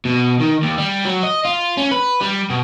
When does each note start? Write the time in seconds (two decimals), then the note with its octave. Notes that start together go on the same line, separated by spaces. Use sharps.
0.05 B2
0.41 D#3
0.63 D#2
0.78 G3
1.05 F#3
1.23 D#5
1.45 F4
1.77 C#4
1.91 B4
2.21 G3
2.50 B2